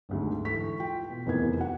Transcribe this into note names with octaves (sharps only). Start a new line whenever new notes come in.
G#1 D2 G#3
E3 A4 C#6 B6
F4 G5
B2
F1 E2 C3 B3 A#4 G#6
F#4 F#5